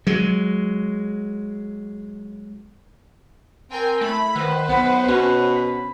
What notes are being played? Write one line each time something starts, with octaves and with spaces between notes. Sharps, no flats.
F#3 G#3
C4 A#4 G5 G#5
A3 E4 B5
D#3 B4 C5 F#5
B1 B3
B2 C#4 F#5
B5